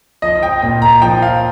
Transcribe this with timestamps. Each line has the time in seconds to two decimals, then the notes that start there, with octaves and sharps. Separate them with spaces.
0.22 F3 D#5
0.43 G5
0.62 A#2 G5
0.82 A#5
1.02 F3 G5
1.22 F5